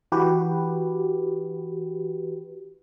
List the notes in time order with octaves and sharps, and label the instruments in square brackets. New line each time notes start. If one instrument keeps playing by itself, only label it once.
[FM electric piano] E3 F#4 G4 B4